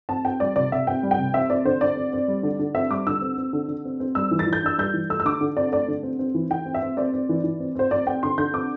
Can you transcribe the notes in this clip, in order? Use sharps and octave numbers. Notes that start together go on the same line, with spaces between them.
C4 A5
C4 G5
G3 D5
C3 D5
C3 E5
C4 G5
G3
G5
C3
C4 E5
C4 D5
D3 C5
D3 D5
C4
C4
G3
D3
D3
C4 E5
G3 D6
D3 E6
C4
C4
D3
D3
C4
C4
G3 E6
E3
A6
E3
G6
D4 E6
G3 G6
E3
A3 E6
E6
D3 D6
D3
C4 D5
A3 D5
D3
C4
C4
E3
E3 G5
C4
E5
C4
C4 D5
C4
E3
E3
C4
C4 C5
C4 D5
C4 G5
D3 C6
D3 G6
C4 D6